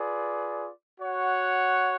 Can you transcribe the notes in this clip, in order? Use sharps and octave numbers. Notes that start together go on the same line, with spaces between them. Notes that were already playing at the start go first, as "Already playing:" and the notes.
Already playing: F4 G#4 B4 D5
F#4 C#5 F#5